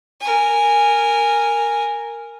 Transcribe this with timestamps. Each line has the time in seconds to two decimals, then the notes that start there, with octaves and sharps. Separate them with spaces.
0.20 A#4 G#5